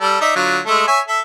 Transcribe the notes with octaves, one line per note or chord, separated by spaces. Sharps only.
G3 A4
D#4 D5 E5
D3 F#3 F4
G#3 A3 A4
C#5 E5 G#5
A4 E5